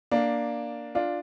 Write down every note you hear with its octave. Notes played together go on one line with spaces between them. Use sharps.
A#3 D4
D4 F4